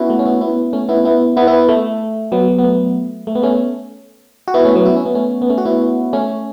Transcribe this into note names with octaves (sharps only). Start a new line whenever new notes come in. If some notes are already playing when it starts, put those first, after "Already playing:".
Already playing: B3 C#4 E4 F#4
A3
C#4
B3 E4
B3 E4
A3 C#4
B3 E4
B3 E4
B3 E4
B3 E4
A3
F#3 B3
F#3
B3
A3
A3
B3
A3 C#4
F#4
B3 E4
A3 C#4
F#3 B3
E4
C#4
B3
A3 C#4
B3
A3 C#4
F#4
B3 E4
A3 C#4